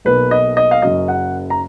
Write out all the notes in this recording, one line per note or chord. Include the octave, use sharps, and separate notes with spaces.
B1 B2 A#3 B4
D#5
D#5
F5
F#1 F#2 C#3 F#3 D#5
F#5
A#5